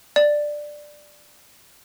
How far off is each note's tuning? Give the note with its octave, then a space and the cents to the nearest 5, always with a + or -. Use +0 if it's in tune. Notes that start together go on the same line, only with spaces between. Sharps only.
D5 +10